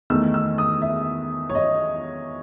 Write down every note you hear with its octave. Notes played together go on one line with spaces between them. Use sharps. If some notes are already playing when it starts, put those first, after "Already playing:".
E2 D#3 A3 E6
E6
D#6
E5
C#5
D#5